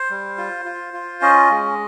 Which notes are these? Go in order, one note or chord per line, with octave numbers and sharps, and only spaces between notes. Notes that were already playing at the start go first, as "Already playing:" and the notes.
Already playing: C5
G3
F4
F4
F4
C#4 D#5
G#3